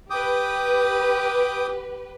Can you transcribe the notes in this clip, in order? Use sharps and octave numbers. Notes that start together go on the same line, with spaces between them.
G4 B4 G5 D6 D#6